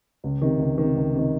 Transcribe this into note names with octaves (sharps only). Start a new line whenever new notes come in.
C#2
C3 D#3
C#2
C3 D#3
C#2
C3 D#3